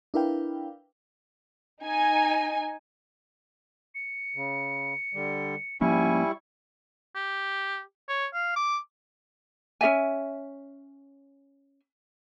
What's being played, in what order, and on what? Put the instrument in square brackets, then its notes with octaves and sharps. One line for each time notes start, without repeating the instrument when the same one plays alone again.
[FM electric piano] D4 E4 A#4 B4 F5 G5
[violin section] D#4 G#5
[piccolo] C#7
[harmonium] C#3
D3 G3
[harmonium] G#2 [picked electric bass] F3 A#3 C#4 [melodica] G3 E4 C#6 [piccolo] G#5
[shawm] G4
C#5
F5
D6
[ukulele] C#4 G#4 E5 G#5